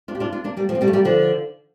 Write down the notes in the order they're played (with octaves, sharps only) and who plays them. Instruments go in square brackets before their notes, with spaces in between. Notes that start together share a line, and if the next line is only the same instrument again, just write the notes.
[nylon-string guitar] D4 F4
G4
D4 F4
D4 F4
A#3 D4
G3 A#3
F3 A3
C4
G3 A#3
A3
G3 A#3
D3 F3